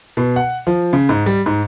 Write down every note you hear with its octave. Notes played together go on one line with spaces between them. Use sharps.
B2
F#5
F3
C#3
G#2
G3
G#2